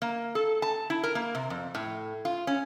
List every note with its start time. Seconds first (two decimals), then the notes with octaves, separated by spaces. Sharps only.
0.02 A#3
0.35 A4
0.62 A5
0.90 E4
1.04 A#4
1.15 A#3
1.35 C3
1.50 F2
1.75 A2
2.25 F4
2.47 C#4